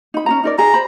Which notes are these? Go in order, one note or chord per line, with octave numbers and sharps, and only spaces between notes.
D#4 B5
C#4 D#4 A#5
D#4 A#4 D5
G#4 A#5
C5 B5